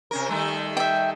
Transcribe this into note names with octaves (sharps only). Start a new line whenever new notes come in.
C3 C#4 A#4
D#3 G3 A3
E5 G5